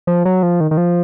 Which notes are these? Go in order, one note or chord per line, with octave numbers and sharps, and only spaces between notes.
F3
F#3
F3
D#3
D#3
F3